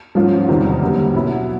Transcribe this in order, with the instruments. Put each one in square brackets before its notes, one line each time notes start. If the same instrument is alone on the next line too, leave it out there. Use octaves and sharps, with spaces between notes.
[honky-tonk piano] G#2 F3 A3 C#4 F4
E2 C3 D#3 G3
F#2 D3 G3 A#3
B2 F#3 B3 E4